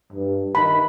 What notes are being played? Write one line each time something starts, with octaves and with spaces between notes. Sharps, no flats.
G2
D#3 B5